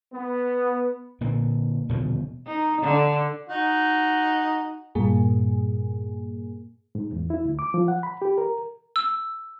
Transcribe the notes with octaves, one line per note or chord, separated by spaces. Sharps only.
B3
A#2 D3 A#3
D#1 B2 D3 F3
D#4
D3
D#4 F#4
G2 A#2 A#3 G#4
G#2
E2
E4
D2
D6
F3
F#5
B5
G4
A#4
E6